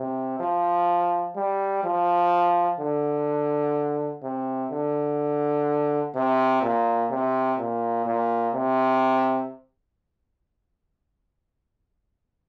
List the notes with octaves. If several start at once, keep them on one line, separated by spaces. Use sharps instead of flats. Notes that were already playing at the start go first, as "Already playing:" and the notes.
Already playing: C3
F3
G3
F3
D3
C3
D3
C3
A#2
C3
A#2
A#2
C3